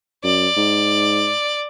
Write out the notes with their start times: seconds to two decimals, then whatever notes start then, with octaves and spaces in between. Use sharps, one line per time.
0.24 F#2 D5
0.57 G#2